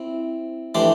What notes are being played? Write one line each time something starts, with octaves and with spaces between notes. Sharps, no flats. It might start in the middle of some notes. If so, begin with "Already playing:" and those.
Already playing: C4 E4
E3 A3 D4 G4 C5